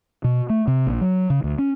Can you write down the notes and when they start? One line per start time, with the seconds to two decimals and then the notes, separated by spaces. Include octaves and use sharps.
0.24 B2
0.50 A3
0.68 C3
0.87 A#1
1.01 F#3
1.30 C#3
1.44 D2
1.58 C#4